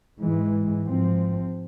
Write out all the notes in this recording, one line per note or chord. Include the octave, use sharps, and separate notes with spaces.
G#2 E3 G#3
G#2 F3 C4